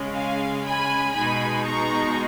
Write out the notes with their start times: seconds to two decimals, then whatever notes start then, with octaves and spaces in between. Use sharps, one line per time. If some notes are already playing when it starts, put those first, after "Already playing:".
Already playing: C#3 G#3 C#4
0.14 F5 G#5
0.64 G#5 B5
1.15 B2 G#3 D#4 G#5 B5
1.65 A#5 C#6